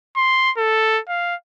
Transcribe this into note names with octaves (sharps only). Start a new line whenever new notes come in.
C6
A4
F5